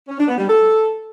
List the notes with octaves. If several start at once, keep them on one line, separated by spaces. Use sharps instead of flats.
C#4
D4
B3
G3
A4